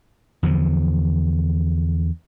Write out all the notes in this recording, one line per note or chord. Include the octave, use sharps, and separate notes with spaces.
E2 D3 F3